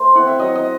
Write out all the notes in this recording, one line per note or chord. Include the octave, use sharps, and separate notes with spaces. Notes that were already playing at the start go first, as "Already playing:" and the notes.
Already playing: A3 C5
C4 E4 F#5
E5
F#3 D#5
D#5